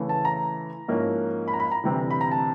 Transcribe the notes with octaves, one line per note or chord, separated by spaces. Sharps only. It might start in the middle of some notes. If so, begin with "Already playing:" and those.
Already playing: C#3 E3 A3
A5
A#5
G#2 F3 A#3 C#4 E4
B5
A#5
B5
A#5
D2 C3 E3 G3 C4
B5
A#5
A5